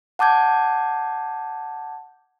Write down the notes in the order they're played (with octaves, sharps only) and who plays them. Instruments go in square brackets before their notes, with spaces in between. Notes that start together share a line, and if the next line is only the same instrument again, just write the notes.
[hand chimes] F#5 A5 D6 G6 G#6